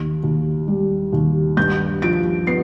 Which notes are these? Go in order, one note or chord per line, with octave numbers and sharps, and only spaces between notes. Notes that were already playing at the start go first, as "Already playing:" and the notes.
Already playing: D#2
D#2
G3
D#2
G2 G6
F3 D7
B3 C7